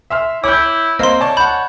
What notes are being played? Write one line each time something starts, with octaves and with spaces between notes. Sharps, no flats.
E5 C6 F6
E4 C#5 D6 G6
A#3 C4 D#5 F5 C6
C#5 D5 A5
F#5 A5 B5 G6